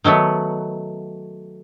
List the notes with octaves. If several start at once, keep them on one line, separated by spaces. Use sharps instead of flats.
D#3 F#3 A3 B3